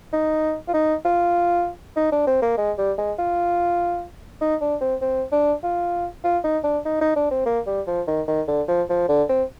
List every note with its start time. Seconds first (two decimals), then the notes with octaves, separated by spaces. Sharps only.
0.13 D#4
0.68 F4
0.73 D#4
1.05 F4
1.96 D#4
2.12 D4
2.27 C4
2.42 A#3
2.58 G#3
2.78 G3
2.98 G#3
3.19 F4
4.41 D#4
4.61 D4
4.81 C4
5.01 C4
5.32 D4
5.63 F4
6.24 F4
6.44 D#4
6.64 D4
6.85 D#4
7.01 D#4
7.16 D4
7.31 C4
7.46 A#3
7.67 G3
7.87 F3
8.08 D#3
8.28 D#3
8.48 D3
8.68 F3
8.89 F3
9.09 D3
9.29 C4